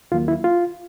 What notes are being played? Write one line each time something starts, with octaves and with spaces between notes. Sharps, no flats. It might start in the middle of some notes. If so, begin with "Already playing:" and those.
D#2 D#3 F#3 A#3 F4
E4
F4